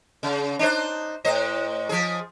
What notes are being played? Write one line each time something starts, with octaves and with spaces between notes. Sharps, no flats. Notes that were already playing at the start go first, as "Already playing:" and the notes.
C#3
D4 D#4 C5
A2 C5 D#5
F3 G#4